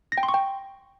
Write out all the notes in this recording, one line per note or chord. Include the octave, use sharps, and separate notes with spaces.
A#6
G5
C6
C#6
G5